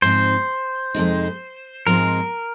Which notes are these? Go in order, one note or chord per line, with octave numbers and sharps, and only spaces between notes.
G#2 F3 C4 D#4 C5
F2 C3 G#3 D#4
G#2 F3 G#3 C4 D#4 A#4